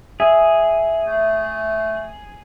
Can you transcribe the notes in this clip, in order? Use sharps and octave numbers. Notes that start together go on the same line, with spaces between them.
G#4 E5
A3